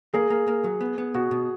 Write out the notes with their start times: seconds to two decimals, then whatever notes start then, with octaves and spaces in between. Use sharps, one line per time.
0.14 A#3 G#4
0.30 A#3
0.48 A#3
0.64 F#3
0.81 B3
0.98 B3
1.14 B2 F#4
1.31 B2